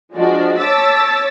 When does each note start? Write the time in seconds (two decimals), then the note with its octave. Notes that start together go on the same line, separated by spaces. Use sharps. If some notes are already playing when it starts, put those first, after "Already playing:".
0.16 F3 G#3 D4 F#4 D5
0.59 C#5 A5 D6 E6 A6 B6